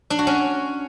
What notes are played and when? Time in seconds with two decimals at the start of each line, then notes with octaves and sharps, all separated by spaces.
0.10 D4
0.19 F#4
0.27 C#4